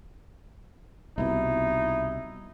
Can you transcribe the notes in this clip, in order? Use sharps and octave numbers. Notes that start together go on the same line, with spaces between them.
C2 B2 D#4 E4